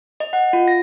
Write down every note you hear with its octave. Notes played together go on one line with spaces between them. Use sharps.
D#5
F#5
F4
A#6